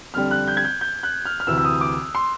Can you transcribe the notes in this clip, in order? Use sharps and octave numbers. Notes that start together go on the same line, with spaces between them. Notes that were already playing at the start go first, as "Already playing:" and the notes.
F2 D3 G3 F6
F#6
G6
G#6
G6
G6
F#6
F6
F6
D2 C3 E3 E6
E6
D#6
D6
C6